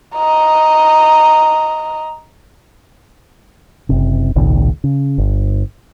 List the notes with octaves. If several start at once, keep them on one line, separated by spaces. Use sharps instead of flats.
D#5 A#5
F#1 C3
G#1 C#2 A#2 D#3
C#3
G1